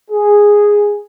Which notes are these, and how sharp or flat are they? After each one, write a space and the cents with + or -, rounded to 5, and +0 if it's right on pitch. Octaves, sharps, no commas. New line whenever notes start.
G#4 -5